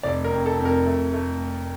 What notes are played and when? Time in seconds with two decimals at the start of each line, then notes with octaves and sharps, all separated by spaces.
0.03 F1 D5
0.24 A#4
0.32 F2
0.46 A4
0.59 F2
0.65 A#4
0.86 A3
1.13 A3